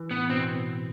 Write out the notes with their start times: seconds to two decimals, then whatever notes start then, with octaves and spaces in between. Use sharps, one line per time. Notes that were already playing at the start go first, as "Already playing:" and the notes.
Already playing: E3
0.11 A2 B3
0.29 B2 C4